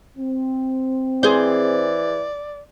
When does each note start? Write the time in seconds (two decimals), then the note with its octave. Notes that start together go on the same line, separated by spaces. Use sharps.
0.18 C4
1.23 E3 G#4 C5 D5